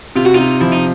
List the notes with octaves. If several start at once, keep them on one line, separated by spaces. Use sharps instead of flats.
C3 F4
F#4
C3 D#4 F4
F3 E4
D#4